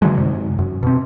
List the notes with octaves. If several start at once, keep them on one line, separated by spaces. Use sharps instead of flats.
D3 E3 F#3 G#3
F#2 C3
F#2
B2 C4